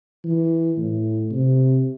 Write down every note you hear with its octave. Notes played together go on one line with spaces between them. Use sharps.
E3
A2
C3